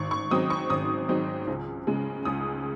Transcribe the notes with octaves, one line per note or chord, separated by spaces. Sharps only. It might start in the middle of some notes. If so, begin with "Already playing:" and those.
Already playing: G#1 C#6
C#6
G#2 F#3 C4 D#4 D#6
C#6
G#1 D#6
G#2 F#3 C4 D#4
C#2
C#3 G#3
C#2 D#6